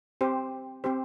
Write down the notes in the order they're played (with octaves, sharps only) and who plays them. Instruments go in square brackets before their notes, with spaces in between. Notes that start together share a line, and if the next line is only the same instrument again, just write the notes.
[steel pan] C4 G4 C5
C4 G4 C5